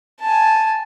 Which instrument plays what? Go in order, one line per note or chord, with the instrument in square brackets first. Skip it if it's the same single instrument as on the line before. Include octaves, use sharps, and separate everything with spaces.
[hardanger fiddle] G#5 A5